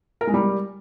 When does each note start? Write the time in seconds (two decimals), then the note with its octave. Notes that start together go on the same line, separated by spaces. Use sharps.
0.21 A#4
0.27 G#3
0.34 G3